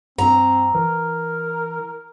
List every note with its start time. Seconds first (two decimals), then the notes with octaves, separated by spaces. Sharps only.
0.18 G2 C4 A#5
0.75 E3 A#4